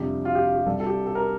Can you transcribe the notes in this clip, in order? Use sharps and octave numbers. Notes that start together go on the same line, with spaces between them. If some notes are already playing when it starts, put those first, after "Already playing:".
Already playing: F2 C3 G3 D4 G4
F4
G4
F4
G4
C2 C3 G3 A4
A4
G4
A4
A#4